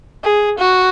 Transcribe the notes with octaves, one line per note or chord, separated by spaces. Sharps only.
G#4
F#4